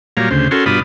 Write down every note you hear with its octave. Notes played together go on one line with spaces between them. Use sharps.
A#2 F#3 G3 C#5 F5 A#5
D2 C#3 C5
C#4 F#4 A4 A#4 C6
G2 B2 D4 F4 B5 D#6